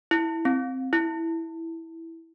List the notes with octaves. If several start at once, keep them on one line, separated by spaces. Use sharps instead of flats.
E4
C4
E4